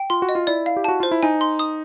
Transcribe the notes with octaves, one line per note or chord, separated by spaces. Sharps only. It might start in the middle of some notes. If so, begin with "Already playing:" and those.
Already playing: G5
F4 C6
F#4
D#5
F4
E4 D5
F5
G4
F#4 A5
F4 C5
E4
D#4 G#5
C6
D#6